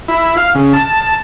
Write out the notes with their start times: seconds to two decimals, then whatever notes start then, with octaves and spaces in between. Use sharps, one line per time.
0.08 E4
0.37 F5
0.55 C#3
0.73 A5